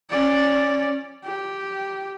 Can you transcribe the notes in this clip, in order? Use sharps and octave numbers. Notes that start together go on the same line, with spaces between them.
C#4 D5
G4